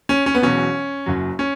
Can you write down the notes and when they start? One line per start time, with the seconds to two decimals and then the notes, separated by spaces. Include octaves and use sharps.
0.09 C#4
0.26 C#4
0.35 B3
0.42 E1 E2 B2 F#3 C#4
1.06 F#1 F#2 F#3
1.39 C#4